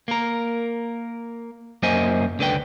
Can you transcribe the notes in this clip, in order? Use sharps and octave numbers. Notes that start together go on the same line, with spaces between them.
A#3 A#4
F#2 A#3 A#4 C5 D#5 G#5
C#2 D3 B4 G5